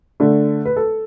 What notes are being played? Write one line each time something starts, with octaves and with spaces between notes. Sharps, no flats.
D3 A3
B4
A4